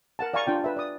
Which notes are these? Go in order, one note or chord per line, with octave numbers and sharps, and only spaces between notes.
A#4 F#5 A5
D5 F5 G#5 A#5 C#6
D4 F4 G5
B4 E5
D5 D#6